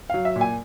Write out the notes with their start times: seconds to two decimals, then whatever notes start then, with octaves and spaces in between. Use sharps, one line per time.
0.10 F#3 F5
0.25 E5
0.36 A#2
0.41 G#5